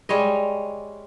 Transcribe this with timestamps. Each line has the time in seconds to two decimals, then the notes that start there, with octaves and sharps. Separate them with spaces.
0.09 G3 G#3 C#5 D#5